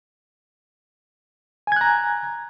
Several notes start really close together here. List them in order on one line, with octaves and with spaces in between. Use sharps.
G#5 G#6 F#6 A#5